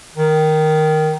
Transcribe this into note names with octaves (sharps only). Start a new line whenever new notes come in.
D#3